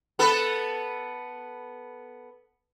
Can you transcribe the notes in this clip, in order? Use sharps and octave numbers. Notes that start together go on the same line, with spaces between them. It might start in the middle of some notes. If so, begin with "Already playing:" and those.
B3 A4 B4